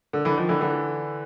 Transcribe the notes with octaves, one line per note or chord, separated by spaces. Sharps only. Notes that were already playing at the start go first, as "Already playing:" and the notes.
D3
D3 E3
D#3 F3
D3 E3
D3 E3